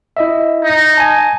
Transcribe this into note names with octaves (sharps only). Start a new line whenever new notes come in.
E4 D#5 E5
D#4
G#5 A5